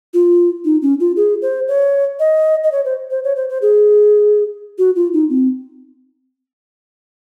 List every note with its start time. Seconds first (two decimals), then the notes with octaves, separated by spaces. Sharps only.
0.14 F4
0.65 D#4
0.82 C#4
1.00 F4
1.16 G#4
1.42 C5
1.68 C#5
2.20 D#5
2.64 D#5
2.72 C#5
2.85 C5
3.11 C5
3.24 C#5
3.36 C5
3.49 C5
3.62 G#4
4.78 F#4
4.96 F4
5.13 D#4
5.30 C4